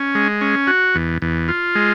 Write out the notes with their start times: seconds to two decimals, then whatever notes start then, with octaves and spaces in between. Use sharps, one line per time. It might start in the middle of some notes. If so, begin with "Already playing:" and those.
Already playing: C#4
0.15 G#3
0.41 C#4
0.67 F#4
0.95 E2
1.22 E2
1.48 F4
1.75 G#3